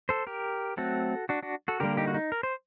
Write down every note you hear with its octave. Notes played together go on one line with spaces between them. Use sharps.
A4 C5
G4 A#4
F#3 A3 C4 F#4 A4
D4 F#4
D4 F#4
F#4 A4
D3 G3 A#3 G4 A#4
D#4 G4
F#4
D#4
A#4
C5